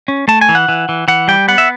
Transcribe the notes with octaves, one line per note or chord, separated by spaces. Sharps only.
C#4
A3 A5
G#5
E3
F#5
E3
E3
E3 F#5
G3 G5
B3 F#5
E5